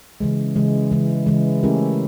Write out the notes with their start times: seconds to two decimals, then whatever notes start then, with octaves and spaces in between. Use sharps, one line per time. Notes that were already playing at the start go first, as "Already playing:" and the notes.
0.20 C#3 E3 G#3
0.56 C#3 E3 G#3
0.91 C#3 E3 G#3
1.26 C#3 E3 G#3
1.63 A3 C#4 E4 G4 A#4